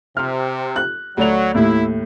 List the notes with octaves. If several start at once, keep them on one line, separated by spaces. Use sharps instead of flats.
C3 F6
F#6
D2 F#3 D5 F7
D#2 A2 E4